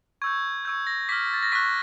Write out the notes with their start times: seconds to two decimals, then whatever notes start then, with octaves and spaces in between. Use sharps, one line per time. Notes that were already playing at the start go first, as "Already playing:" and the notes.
0.22 C#6 E6 G6 G#6
0.65 C#6 E6 G6 G#6
0.87 A#6
1.09 D6 F6 B6
1.33 A6
1.43 A#6
1.52 C#6 F#6 B6